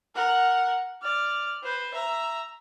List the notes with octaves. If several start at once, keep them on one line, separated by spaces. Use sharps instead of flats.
A#4 F#5
D5 F6
B4 C5
E5 A#5